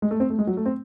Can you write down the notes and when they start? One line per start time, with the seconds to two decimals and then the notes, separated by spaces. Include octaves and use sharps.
0.02 G#3
0.11 A3
0.20 C4
0.30 A3
0.39 G#3
0.47 F#3
0.57 A3
0.66 C4